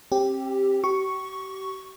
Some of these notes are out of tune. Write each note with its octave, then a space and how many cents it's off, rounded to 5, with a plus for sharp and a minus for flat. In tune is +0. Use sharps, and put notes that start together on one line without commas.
C4 +40 G4 +0
G4 -40 C#6 +0